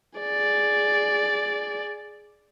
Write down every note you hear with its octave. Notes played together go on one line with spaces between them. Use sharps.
G#4 D5